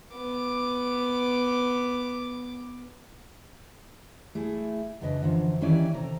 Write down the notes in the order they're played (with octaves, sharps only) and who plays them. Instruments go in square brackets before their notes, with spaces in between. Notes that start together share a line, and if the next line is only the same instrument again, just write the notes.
[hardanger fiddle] B3 D6
[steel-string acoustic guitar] A3 E4 G#4
F#2 C#3 D4 B4 D#5
F#2 D3 E3 F3
D#3 E3 C#4 E4 G4 D5
C3 A4 A#5